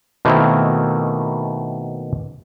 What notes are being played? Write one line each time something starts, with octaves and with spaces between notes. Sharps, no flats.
B2 D#3 A3 A#3 C4 E4